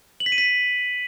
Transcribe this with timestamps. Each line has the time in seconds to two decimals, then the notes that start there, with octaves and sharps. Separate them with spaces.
0.20 F#7
0.26 B6
0.32 D#7
0.38 B6